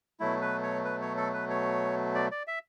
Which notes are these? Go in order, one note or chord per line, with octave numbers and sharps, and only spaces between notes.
B2 F#3 A3 E4
B4
C#5
B4
C#5
A4
B4
C#5
D5
D5
E5